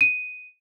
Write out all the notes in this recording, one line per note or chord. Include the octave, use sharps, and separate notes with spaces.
D#7